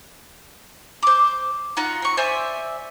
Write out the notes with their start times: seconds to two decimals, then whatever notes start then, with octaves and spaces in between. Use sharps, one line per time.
1.03 C5 D6
1.77 D#4 F4 F#4 F#5
2.02 C4 C#6
2.17 C5 D5 E5 G#5